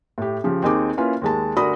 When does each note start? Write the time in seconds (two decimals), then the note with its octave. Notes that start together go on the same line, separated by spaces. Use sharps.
0.18 A2 G4
0.44 C#3 F3 G4
0.62 D#2 C4 D#4 G#4 D6
0.97 A#3 C#4 E4 F4 B4
1.22 D#2 G#3 A5
1.57 D2 F#4 A#4 D5 B5 D#6